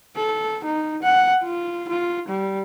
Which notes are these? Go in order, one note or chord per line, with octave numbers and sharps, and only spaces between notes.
A4
D#4
F#5
F4
F4
G3